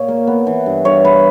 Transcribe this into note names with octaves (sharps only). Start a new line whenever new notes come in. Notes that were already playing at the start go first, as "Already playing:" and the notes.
Already playing: A#2 C#5
A#3
B3
E3
G2
G2 C#5
B3 B4